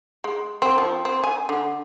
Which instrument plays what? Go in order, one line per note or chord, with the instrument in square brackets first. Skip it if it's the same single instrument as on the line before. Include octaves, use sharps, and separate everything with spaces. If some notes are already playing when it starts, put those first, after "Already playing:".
[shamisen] G#3
C4
F3
C4
G#5
D3